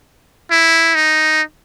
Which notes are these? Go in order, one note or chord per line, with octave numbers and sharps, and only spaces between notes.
E4
D#4